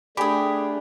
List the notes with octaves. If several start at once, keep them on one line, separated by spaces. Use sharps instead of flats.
A3 D4 G4 G#4 G#5 B5 D6